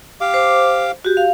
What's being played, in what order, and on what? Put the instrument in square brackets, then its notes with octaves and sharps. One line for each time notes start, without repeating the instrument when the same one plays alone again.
[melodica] G4 F5 D6
[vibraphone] C5
F#4 G4
F5